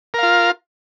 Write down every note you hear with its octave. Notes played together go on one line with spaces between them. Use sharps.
F4 A#4 F5